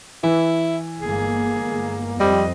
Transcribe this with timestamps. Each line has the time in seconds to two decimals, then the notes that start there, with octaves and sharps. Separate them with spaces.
0.23 E3 E4
1.01 G1 G#3 A#3 G#4
2.20 F2 G3 C4 D#5